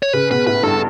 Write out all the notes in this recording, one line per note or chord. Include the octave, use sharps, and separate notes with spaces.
C#5
C#3 B4
B2 B4
A2 B4
G2 A4